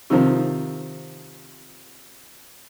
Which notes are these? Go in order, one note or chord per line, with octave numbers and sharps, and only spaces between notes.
C3 D#3 F3